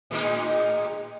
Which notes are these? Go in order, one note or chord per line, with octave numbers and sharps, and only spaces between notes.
A2 G#3 D#4